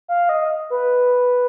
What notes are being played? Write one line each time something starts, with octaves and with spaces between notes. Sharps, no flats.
F5
D#5
B4